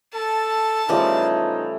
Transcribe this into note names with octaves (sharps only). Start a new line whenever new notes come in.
A4 A5
C#3 E3 F3 G3 A3 D#4 G#4